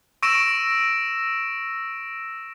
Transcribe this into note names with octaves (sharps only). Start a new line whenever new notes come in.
C#6 E6 A#6 D7 E7